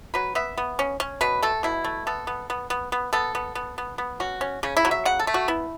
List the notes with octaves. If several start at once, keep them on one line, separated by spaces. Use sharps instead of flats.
F#3 B4
B3 E5
B3
C#4
C#4
B2 B4
A3 A4
B2 E4
A3
B3 A4
B3
B3
B3
B3
B3 A4
B3
B3
B3
B3
C#4 F#4
C#4
C#3 C#4
E4
F#3
E5
C#3 F#5
A4
A3
F#4
B3 E4